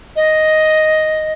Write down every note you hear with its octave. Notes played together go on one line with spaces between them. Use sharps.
D#5